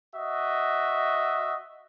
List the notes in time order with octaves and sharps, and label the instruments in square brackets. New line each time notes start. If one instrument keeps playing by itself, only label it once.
[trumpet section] F#4 D#5 E5